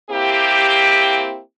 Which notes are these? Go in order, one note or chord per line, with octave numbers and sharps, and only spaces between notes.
A#3 C4 E4 G4